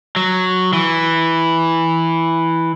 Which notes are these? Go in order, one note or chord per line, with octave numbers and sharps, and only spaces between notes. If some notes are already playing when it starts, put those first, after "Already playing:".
F#3
E3